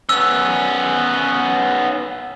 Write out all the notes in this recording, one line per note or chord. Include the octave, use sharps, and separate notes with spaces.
B3 C#4 E6